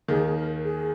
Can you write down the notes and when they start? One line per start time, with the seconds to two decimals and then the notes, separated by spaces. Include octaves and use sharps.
0.08 D#2 D#3 G#4
0.37 A#4
0.64 G#4